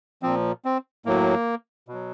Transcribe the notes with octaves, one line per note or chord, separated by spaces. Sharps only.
A#2 F3 C4
C4
A2 F#3 A#3
B2 F#3